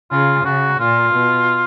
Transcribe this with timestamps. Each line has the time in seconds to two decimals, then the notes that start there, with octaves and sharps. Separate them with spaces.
0.11 C#3 F4
0.45 C#3 F#4
0.80 A#2 F4
1.15 B2